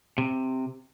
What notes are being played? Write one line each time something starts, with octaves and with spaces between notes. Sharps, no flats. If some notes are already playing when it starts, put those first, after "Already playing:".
C3